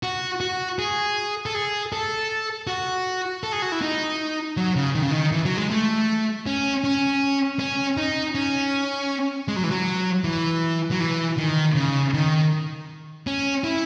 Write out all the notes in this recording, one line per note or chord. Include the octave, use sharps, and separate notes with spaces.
F#4
F#4
G#4
A4
G#4
A4
F#4
A4
G#4
F#4
E4
D#4
F#3
C#3
D#3
C#3
D#3
E3
F#3
G#3
A3
C#4
C#4
C#4
D#4
C#4
G#3
F#3
E3
F#3
E3
F#3
E3
D#3
C#3
D#3
C#4
E4